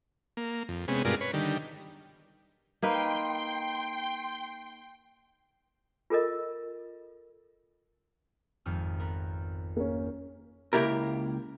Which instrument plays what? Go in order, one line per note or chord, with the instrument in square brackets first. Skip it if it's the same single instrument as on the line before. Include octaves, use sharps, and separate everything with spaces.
[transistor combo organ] A#3
F2
C3 G#3 B3 C#4
G2 B2 G#3 F4 A#4 D5
B4 C#5
D3 D#3 G3
[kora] A#3 D#4 B4 [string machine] G5 C6
[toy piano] F4 A4 A#4 D#5
[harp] G#1 F2 F6
B3 A#4 B4
[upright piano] A#3 C#4
[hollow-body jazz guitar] C#2 A#3 E4 G4 A#4